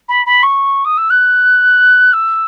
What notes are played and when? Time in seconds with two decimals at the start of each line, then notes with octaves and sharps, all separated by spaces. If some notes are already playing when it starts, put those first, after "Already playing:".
0.09 B5
0.26 B5
0.43 C#6
0.85 D#6
0.97 E6
1.10 F#6
2.13 E6